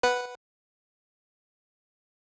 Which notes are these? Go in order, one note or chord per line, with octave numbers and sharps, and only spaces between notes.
B4 F#5